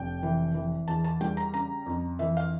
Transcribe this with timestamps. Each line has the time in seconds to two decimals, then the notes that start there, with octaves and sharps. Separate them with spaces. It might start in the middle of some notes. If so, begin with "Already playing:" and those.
Already playing: F1 G5
0.23 E3
0.55 E3
0.88 E2 A5
1.04 A5
1.21 G3 G5
1.37 A#5
1.53 C#3 A#5
1.86 F2
2.19 E3 E5
2.37 F5